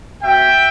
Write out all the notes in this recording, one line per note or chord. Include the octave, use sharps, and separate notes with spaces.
B3 F#4 E5 G5